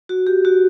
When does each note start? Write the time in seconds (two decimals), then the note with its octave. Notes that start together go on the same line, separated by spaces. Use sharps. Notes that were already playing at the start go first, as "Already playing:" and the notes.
0.09 F#4
0.27 G4
0.45 F#4